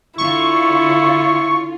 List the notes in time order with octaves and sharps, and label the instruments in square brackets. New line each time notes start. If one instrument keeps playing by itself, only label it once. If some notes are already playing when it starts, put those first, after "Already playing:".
[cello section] D3 F4 [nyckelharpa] E4 [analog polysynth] C#6